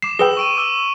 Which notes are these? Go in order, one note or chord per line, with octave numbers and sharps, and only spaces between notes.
D6 C7 E7
G#4 B4 G5 E6 G7
C#6 D7 D#7
D6 E6 G7